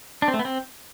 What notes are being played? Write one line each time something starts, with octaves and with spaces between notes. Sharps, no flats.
D4
C4
A3
B3
C4